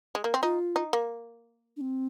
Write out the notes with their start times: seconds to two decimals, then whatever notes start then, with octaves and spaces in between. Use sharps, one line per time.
0.15 G#3
0.24 A#3
0.34 C4
0.42 D#4 F4
0.76 D#4
0.93 A#3
1.77 D4
1.81 C4